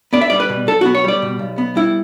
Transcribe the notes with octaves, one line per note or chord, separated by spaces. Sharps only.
B3 D5
E5
G3 D5
B4
B2
B1 A4
B3 F#4
C#5
G3 D5
B2
B1
B3
G3 E4